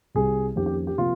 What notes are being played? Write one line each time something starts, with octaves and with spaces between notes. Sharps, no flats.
C2 C3 G3 G#4
F2 D#3 A#3 C#4 G4
G4
G4
C3 F3 A#3 F4